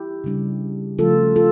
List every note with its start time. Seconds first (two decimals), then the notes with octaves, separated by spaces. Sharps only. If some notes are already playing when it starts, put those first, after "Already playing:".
Already playing: E4 G4
0.24 C#3 G3 D4
0.99 C#3 F3 A3 F4 A4
1.36 F4 A4